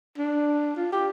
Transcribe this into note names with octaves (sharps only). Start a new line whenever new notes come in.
D4
F4
G4